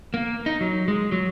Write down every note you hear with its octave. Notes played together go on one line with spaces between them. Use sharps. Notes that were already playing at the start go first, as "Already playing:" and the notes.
A#3
D#4
F#3
G#3
F#3